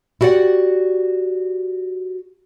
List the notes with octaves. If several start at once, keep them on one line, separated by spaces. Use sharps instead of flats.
E4 F#4 G4 D5 F#5